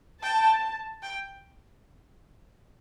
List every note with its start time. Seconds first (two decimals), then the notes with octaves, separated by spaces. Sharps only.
0.23 G5 A5
1.03 G5